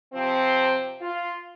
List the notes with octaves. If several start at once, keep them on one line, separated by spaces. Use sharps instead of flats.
C3 F3 C4
F4